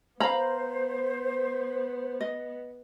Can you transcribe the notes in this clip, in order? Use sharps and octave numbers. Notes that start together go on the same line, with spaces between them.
B3 C5 F5 A#5 B5
D#5